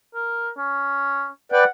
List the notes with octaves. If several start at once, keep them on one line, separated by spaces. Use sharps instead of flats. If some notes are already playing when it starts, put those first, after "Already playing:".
A#4
C#4
B4 D5 F#5 G5